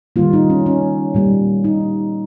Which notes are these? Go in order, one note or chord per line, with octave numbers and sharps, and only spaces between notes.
D#3 G3 A#3 F4
D#4
C#4
C#4
A#2 G3 A#3
D#4